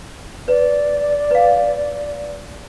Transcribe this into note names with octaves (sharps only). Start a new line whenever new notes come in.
B4 D5
B4 F5